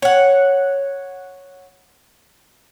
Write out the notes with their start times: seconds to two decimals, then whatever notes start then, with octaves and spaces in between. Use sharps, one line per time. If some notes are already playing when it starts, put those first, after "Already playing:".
0.02 C#5 F#5